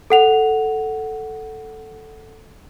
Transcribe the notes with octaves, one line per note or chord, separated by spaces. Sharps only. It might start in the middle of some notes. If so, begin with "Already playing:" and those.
A4 F#5 F7